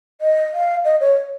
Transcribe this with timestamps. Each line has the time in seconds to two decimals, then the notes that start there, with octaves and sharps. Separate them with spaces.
0.21 D#5
0.54 F5
0.85 D#5
1.01 C#5